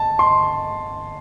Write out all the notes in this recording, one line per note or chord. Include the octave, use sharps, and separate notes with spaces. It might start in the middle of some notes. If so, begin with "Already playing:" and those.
Already playing: A5
C6